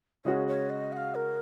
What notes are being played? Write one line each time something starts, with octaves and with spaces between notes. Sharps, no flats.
C#3 G#3 C#4 F#4 C#5
C#5
D#5
F#5
F5
A#4